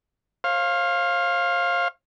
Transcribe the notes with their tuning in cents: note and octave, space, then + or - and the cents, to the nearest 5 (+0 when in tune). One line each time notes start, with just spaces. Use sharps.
C5 +45 F5 +0